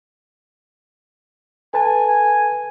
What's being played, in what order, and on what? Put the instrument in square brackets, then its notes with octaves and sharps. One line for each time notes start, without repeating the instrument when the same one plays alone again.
[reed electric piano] A4 B4 A5 [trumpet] G#5